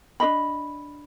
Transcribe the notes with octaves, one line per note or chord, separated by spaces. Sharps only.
D4 F#4 D#5 B5